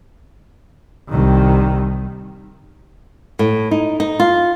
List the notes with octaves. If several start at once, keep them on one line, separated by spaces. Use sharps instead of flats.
C2 D#3
A2
D#4
D#4
F4